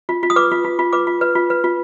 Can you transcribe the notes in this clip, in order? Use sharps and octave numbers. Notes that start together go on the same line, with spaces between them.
F4
F4
D#6
B4 D6
F4
F4
F4
B4 D6
F4
B4
F4
B4
F4